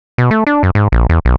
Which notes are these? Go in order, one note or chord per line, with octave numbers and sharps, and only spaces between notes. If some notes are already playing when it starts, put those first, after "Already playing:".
B2
A3
D4
F#2
G#2
A#1
E2
B1